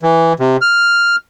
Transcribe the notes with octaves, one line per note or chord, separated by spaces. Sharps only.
E3
C3
F6